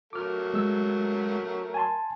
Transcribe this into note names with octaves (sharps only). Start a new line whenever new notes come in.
F#3 A3 A#4 D6 F6
G#3 E6
G#5 A5 C6